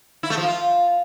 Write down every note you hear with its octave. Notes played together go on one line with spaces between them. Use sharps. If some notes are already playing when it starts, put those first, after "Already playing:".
E4
A3
F3
F4